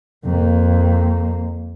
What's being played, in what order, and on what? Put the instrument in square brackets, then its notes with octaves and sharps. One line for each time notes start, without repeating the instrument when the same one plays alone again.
[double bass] F2 A#3